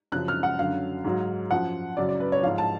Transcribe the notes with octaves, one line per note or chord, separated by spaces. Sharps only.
F#2 C#3 F3 F#6
F6
F#5
F#2 D3 F#3 F5
G#2 F#3
F#2 F3 F#5
F#2 C#3 F#3 D5
D5
B4
C#5
G#2 F3 F5
A5